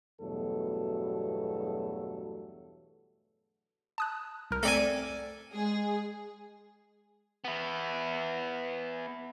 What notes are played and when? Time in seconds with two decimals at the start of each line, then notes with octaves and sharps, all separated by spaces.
0.21 E2 G2 B2 F#3 A3 A4
3.98 A5 D#6 F#6
4.51 C2 A#4
4.63 A3 C4 A4 D5 G#5
5.53 G#3 G#4
7.44 B3 E4